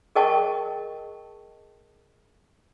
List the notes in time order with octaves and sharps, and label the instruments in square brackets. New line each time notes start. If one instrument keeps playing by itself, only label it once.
[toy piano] G#4 A#4 D#5 G5 A5 C#6